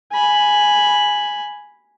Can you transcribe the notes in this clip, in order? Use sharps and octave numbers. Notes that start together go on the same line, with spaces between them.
G#5 B5